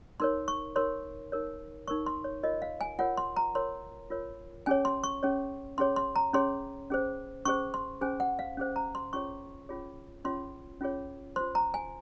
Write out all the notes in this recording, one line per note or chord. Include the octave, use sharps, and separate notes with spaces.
D#4 A#4 C#5 C6
C#6
D#4 A#4 C#5 C6
D#4 A#4 C#5
D#4 A#4 C#5 C#6
C6
C#5
F4 A#4 C#5 D#5
F5
G#5
F4 A#4 C#5 F#5
C6
A#5
F4 A#4 C#5 C6
F4 A#4 C#5
C#4 G#4 C#5 G#5
C6
C#6
C#4 G#4 C#5
C#4 G#4 C#5 C6
C6
A#5
C#4 G#4 C#5 C6
C#4 G#4 C5
C#4 G#4 C5 C#6
C6
C#4 G#4 C5 G#5
F#5
F5
C#4 G#4 C5
A#5
C6
C#4 F4 G#4 C#5 C#6
C#4 F4 G#4 C#5
C#4 F4 G#4 C#5 C6
C#4 F4 G#4 C#5
F4 C5 C6
A#5
G#5